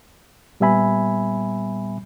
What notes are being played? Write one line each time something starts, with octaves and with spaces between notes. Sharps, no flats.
A#2 G3 B3 E5 G#5 B5